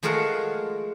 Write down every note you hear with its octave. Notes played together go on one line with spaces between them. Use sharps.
F3 G#3 A3 G#4 A#4 F#5